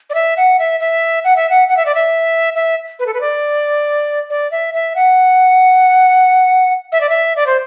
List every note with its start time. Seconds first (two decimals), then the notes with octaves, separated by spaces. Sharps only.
0.10 D5
0.14 E5
0.37 F#5
0.59 E5
0.80 E5
1.24 F#5
1.36 E5
1.50 F#5
1.68 F#5
1.77 E5
1.86 D5
1.95 E5
2.55 E5
2.99 B4
3.06 A4
3.14 B4
3.21 D5
4.30 D5
4.51 E5
4.74 E5
4.96 F#5
6.92 E5
7.01 D5
7.09 E5
7.36 D5
7.47 C5